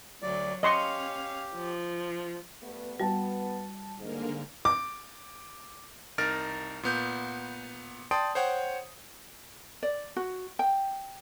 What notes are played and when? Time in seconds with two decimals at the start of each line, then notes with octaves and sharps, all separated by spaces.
0.22 D2 F#3 D5
0.63 C#4 G4 D#5 F5 C6 C#6
1.56 F3
2.62 G3 A3 B3
3.00 G3 B3 F#4 A5
3.99 G#2 D3 A#3 A#4
4.65 D6
6.18 C2 D#4 A#4 F6 A6 D7
6.83 A#2 B3 G6
8.11 D5 G5 A5 C6 D#6 D7
8.35 C5 C#5 F#5 G5
9.83 D5
10.16 F#4
10.59 G5